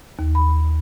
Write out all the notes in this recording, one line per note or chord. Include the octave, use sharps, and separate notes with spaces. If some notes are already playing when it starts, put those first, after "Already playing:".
D#2
B5